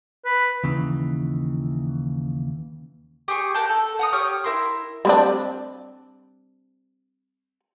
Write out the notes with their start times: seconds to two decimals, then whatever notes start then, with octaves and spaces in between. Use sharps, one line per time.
0.25 B4
0.64 D#2 C#3 E3
3.28 G4 G#4 C#6
3.54 A#4 F#5 A5 G6
3.70 A4
3.99 F#5 A#5 D#6
4.13 G4 C#5 D#6 F6
4.44 E4 A#4 C6
5.05 G3 C4 D4